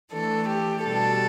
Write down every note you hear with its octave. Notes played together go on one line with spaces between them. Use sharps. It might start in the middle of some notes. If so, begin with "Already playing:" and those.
E3 A3 D4 A4
G4
B2 G3 D4 A4